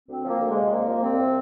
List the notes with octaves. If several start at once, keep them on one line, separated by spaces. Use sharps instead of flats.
D2 C4
F3
A#3
D2
G#3
C3
C2 A#3
F3
C2 C4
C3